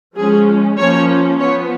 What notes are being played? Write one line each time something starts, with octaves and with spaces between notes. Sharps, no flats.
F3 G#3 C#4 G#4
F3 A#3 C#4 C#5
F3 B3 C#5